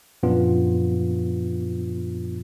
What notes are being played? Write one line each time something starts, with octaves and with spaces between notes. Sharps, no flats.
F#2 A#2 F3 B3 D4 F4